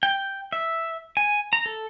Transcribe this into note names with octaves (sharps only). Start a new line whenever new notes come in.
G5
E5
G#5
A#5
A4